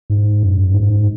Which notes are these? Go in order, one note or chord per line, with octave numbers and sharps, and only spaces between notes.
G#2
F#2
G#2